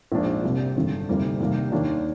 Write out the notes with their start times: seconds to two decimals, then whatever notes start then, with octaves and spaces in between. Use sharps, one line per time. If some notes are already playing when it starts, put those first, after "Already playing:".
0.12 A#1 G#2 F3 A#3 D4
0.43 C2 C3 G3
0.75 G#1 G2 D3
1.08 D2 C3 G3 A#3 D#4
1.40 C2 C3 D#3 G3 A#3
1.72 D#2 D#3 A#3 D4